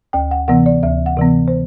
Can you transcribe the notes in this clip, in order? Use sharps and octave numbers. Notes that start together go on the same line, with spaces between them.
D2 G5
F#5
C3 E3 B3 F#5
D5
D2 E5
F#5
C3 E3 B3
C5